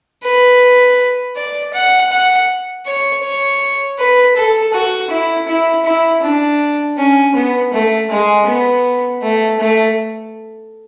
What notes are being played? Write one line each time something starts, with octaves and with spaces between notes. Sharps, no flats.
B4
D5
F#5
F#5
C#5
C#5
B4
A4
F#4
E4
E4
E4
D4
C#4
B3
A3
G#3
B3
A3
A3